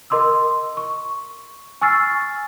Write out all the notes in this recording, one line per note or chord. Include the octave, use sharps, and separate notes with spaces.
A#4 D#5 C6 D6 E6
C#6
G#5 C#6 E6 F6 A6 C7